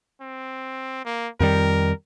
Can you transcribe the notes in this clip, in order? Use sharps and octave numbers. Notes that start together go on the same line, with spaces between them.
C4
A#3
F2 D#3 G3 A#4